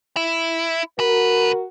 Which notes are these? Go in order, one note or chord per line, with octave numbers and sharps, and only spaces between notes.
E4
D2 F#4 A#4 B4